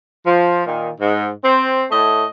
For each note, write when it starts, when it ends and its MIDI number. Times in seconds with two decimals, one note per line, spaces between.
0.25 0.64 53
0.66 0.89 46
0.66 0.89 51
1.00 1.29 44
1.43 1.83 60
1.91 2.24 45
1.91 2.24 57
1.91 2.24 75